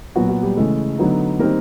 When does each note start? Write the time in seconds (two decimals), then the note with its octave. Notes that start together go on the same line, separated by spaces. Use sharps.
0.16 A#2 F#3 B3 F#4
0.29 F#4
0.43 G3 G4
0.57 C#3 E3 G#3 A3 A4
0.98 D3 F#3 B3 D#4
1.39 D#3 G3 A#3 C4 D#4 A#4